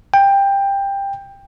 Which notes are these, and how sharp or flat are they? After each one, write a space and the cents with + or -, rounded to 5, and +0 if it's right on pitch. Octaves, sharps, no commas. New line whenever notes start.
G5 +15